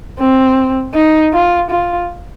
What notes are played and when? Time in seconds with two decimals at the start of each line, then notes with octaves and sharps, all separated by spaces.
0.20 C4
0.94 D#4
1.33 F4
1.70 F4